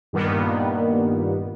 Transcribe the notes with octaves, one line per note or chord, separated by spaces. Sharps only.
G2 A#2 D#3 G3 A#3 B3